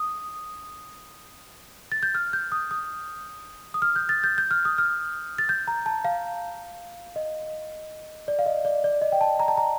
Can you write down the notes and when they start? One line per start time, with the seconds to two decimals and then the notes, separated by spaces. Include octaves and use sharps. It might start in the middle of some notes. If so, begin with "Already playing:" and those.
Already playing: D#6
1.92 A6
2.03 G6
2.15 F6
2.33 G6
2.52 D#6
2.71 D#6
3.74 D#6
3.82 F6
3.96 G6
4.09 A6
4.24 G6
4.38 G6
4.51 F6
4.65 D#6
4.78 F6
5.38 A6
5.49 G6
5.68 A#5
5.86 A5
6.05 F5
7.16 D#5
8.28 D5
8.39 F5
8.46 D#5
8.65 D5
8.84 D5
9.01 D#5
9.12 G5
9.21 A5
9.40 A#5
9.48 A5
9.57 A#5